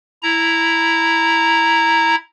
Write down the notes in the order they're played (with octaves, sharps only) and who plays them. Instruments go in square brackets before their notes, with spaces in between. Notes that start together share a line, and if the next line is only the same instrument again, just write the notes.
[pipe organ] E4 A#5